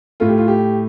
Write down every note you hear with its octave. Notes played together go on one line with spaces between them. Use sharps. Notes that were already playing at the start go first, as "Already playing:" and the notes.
A2 A3 F4
G4
F4
G4